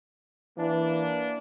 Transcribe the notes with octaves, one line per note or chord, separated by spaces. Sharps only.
E3 A#3 D4